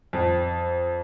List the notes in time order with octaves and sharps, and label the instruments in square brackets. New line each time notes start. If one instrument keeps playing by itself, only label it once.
[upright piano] F2